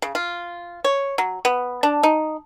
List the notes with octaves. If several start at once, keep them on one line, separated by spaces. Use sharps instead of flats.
C#3
F4
C#5
F#3
B3
D4
D#4